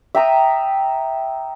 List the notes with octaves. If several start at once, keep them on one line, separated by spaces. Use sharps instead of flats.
E5 G5 A#5 D#6